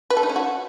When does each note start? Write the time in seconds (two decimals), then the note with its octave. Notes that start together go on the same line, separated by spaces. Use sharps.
0.10 B4
0.17 A4
0.23 D#4
0.29 C#4
0.36 F#4